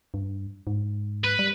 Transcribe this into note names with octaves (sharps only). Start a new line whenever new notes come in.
G2
G#2
B4
G3